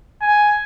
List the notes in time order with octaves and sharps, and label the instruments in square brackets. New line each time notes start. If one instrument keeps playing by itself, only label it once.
[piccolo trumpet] G#5